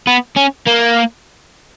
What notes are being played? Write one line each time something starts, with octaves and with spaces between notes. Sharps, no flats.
B3
C#4
A#3